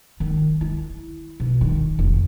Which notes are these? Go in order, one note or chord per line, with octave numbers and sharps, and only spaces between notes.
D#3
E4
B2
D#3
F1